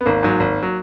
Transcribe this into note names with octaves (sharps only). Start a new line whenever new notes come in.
B3
G#1 A#3
G#2 F#3
G#1
F#3